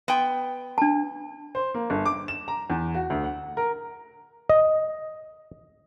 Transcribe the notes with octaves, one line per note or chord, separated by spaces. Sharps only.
B3 G5
D4 A5
C5
A#3
G1
D6
E7
A#5
E2
F#4
D2
F#5
A#4
D#5